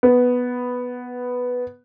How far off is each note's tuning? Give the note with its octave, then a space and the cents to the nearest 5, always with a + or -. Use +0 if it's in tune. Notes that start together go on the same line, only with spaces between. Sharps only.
B3 +0